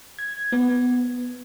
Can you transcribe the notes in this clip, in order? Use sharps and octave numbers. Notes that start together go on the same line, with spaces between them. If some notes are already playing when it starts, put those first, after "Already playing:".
G#6
B3